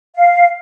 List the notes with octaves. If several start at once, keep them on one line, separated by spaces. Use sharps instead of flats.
F5